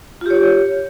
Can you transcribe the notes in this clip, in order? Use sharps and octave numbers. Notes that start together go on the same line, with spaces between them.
F4 G4 C#5